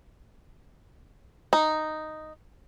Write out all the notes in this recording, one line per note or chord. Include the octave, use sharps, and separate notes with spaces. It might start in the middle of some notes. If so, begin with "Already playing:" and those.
D#4